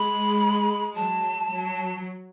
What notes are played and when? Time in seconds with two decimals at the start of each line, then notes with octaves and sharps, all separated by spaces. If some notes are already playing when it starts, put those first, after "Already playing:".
Already playing: G#3 B5
0.95 F#3 A5
1.51 F#3